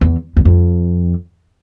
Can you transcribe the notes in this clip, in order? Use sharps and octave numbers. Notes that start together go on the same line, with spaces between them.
E2
E2
F2